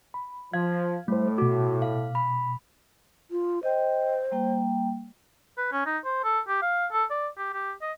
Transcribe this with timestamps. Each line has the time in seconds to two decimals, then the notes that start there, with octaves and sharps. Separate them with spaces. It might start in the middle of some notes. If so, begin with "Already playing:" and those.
0.14 B5
0.54 F3 F5 G#6
1.08 A2 G3 A3 C5
1.38 B2 F#4 D6
1.82 F5
2.15 B5
3.31 F4
3.63 C5 D#5 G5
4.32 G3 A#3 G5
5.58 B4
5.72 C#4
5.86 D#4
6.05 C5
6.24 A4
6.48 G4
6.62 F5
6.92 A4
7.11 D5
7.38 G4
7.53 G4
7.82 D#5